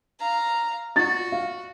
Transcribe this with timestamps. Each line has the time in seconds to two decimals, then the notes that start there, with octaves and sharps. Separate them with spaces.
0.20 F5 A#5
0.96 F4 F#4 A6
1.32 F5